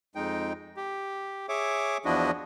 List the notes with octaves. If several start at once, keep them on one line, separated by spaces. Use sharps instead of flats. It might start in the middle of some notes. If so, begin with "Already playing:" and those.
F2 G#3 D#4 G5
G4
G#4 C#5 E5 D6
E2 F3 D4 E4 F#4 D#5